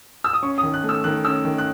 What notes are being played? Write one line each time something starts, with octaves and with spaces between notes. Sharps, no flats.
E6
D#6
C#4 C#6
D#6
D#3
F#6
A3
E6
D#3 F#6
C#4 E6
D#3
F#6